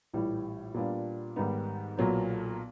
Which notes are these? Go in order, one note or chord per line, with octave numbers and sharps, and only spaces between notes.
A#1 A2 E3 G3
A#2 G3 B3 D4 F4
G#2 D#3 G3 B3 D#4
B1 A#2 F#3 B3